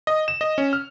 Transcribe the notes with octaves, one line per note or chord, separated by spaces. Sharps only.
D#5
E7
D#5
C#4
F6